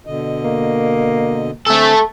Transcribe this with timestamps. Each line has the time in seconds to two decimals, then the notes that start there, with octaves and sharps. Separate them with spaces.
0.07 B2 D3 D#5
0.45 A#3
1.67 D3 A3 C4 A4 G#5